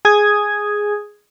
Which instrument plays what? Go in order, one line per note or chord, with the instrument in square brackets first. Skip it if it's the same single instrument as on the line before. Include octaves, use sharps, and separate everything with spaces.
[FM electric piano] G#4 D#6 G#6